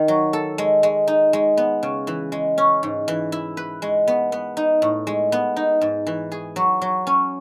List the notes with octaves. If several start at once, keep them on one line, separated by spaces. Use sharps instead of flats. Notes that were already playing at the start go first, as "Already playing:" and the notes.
Already playing: D#3 D#4
F#3
A4
G#3
G#3
D#4
G#3
B3
C#3
E3
G#3
C#4
G#2
E3
E4
B4
G#3
B3
B3
D#4
A2
G#3
B3
D#4
G#2
E3
G#4
F#3
F#3
C#4